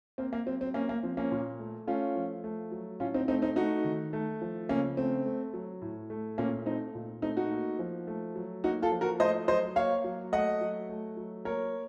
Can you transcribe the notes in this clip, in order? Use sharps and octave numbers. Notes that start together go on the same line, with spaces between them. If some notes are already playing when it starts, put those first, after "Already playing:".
A#3 C4
A#3
F#3 C4
C4
A#3 C#4
A#3
F3 C4
A#3 C#4
A#2
A3
A3 C#4 F4
F3
A3
F#3
A2 C#4 F4
C4 D#4
A3 C4 D#4
C4 D#4
A3 D#4 F#4
D#3
A3
F3
C#3 A#3 C#4
A3 C4
A3
F#3
A2
A3
A#2 A#3 C#4
A3 C4 D#4
A#2
A3 C4 D#4
D#4 F#4
A#3
F3
A3
F#3
A#3 D#4 F#4
F4 A4
F3
F#4 A#4
A3 C5 D#5
F#3 C5 D#5
A#3 C#5 F5
F#3
A3 D#5 F#5
F#3
A3
F#3
A#3 A#4 C#5